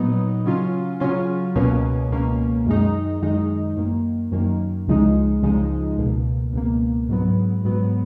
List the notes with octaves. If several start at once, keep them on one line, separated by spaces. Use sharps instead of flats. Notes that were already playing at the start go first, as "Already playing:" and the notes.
Already playing: A#2 F#3 B3 D#4
C#3 F#3 C#4 F4
C#3 F#3 C#4 F4
C#2 B2 A#3 C#4
C#2 B2 A#3 C#4
F#2 D#3 G#3 D#4
F#2 D#3 G#3 D#4
F#2 D#3 A#3
F#2 D#3 A#3
C#2 C#3 F3 G#3 D#4
C#2 C#3 F3 G#3 D#4
C#2 B2 A#3
C#2 B2 A#3
G#2 F#3 B3
G#2 F#3 B3